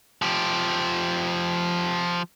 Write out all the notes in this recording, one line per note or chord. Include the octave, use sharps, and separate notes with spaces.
F3 G4